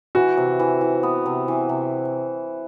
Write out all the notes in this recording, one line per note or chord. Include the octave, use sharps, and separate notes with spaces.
E3 F#4
C3
E3
E3
B3
C3
E3
C3